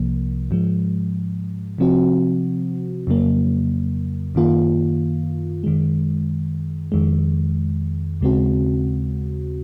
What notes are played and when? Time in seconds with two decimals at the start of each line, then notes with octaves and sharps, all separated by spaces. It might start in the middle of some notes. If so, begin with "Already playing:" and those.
Already playing: C2 C3 F3 A#3
0.51 G#2 F3 G#3
1.78 C3 F3 C4 F#4
3.07 F2 C#3 F#3 A#3
4.35 F#2 D#3 A#3 F4
5.64 F#2 D#3 G#3
6.92 F2 D#3 G#3
8.21 D#2 C#3 G#3 C4 F#4